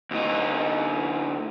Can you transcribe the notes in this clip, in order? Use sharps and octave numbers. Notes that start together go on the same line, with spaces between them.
D2 D#4